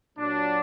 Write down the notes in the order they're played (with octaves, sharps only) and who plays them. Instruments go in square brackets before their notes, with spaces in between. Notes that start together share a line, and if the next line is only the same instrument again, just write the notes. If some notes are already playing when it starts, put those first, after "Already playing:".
[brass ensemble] A#2 F#3 D4